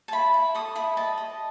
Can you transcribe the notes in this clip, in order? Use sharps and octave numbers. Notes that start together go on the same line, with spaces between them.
A5
E4 B5
E4
A4 D#6
E4 B5
D#5 A5
D#5